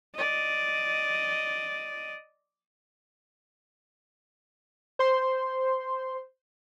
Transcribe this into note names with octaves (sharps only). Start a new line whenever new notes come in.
D5 D#5
C5 C6